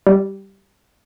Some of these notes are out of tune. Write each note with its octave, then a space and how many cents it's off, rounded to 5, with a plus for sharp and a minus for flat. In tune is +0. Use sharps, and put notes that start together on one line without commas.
G3 -10